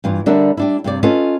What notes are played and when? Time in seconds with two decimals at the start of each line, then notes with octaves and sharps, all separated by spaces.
0.04 G2 E3 F4
0.26 D3 G3 D4 A#4 E5
0.57 G3 D4 E4
0.84 G2 C3 D5
1.03 C#4 F4 A4 B4 D#5